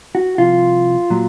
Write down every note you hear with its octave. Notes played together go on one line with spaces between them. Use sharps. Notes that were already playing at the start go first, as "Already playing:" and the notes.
F#4
C2 C3 F3 F4
A#2 F#3